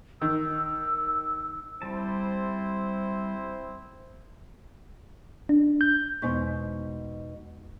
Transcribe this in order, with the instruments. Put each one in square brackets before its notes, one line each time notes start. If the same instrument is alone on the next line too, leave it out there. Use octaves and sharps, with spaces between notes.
[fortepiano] D#3 [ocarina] E6
[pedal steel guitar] G3 A5 [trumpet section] C4 E4 C5
[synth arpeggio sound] D4
[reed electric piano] G6
[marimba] E2 G#3 C#6 [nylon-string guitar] B2 D#4 C5